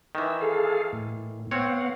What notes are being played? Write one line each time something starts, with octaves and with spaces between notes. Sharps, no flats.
D#3 E3 E6
G#4 A4 F5
A2
B3 C4 C#5 F5 F#5